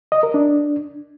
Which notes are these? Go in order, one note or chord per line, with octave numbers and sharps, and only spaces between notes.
D#5
A#4
D4